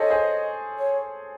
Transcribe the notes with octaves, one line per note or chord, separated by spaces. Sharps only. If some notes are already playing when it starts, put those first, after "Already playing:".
Already playing: G#4 A4 C5 C#5 D#5
G#4 C5
C#5